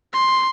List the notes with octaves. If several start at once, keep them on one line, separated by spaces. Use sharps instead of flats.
C6